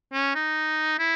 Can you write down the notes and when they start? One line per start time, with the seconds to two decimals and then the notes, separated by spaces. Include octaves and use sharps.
0.13 C#4
0.35 D#4
0.99 E4